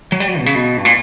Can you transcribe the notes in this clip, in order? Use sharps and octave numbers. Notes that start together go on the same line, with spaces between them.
F#3
G3
F#3
B2
C#3
B2
G2
A#2